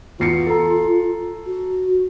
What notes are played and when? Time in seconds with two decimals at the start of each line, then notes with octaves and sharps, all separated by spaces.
0.20 E2 F4 C7 C#7
0.47 A4 A#5
1.46 F#4